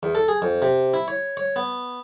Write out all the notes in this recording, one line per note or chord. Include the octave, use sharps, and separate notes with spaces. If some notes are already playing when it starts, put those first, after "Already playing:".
E2
A4
G#4
F2
C3
E4
C#5
C#5
B3